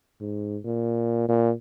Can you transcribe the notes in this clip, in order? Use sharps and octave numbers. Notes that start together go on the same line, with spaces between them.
G#2
A#2
A#2